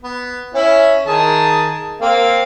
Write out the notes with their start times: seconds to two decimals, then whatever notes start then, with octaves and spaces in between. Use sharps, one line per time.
0.04 B3
0.55 C#4 E4
1.06 D#3 G#4 A5
2.01 A#3 C4 F5